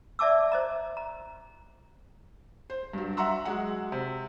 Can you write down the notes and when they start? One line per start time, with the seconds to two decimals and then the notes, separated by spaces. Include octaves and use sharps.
0.19 D5 E5 A5 D6 E6
0.52 C5 D#5 A#5
0.97 A#5
2.70 C5
2.93 G2 F#3
3.17 E5 F#5 A#5 C6 E6
3.45 F#3 G#3 F#5
3.92 C3